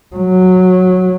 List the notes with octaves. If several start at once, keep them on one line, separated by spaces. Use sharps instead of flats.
F#3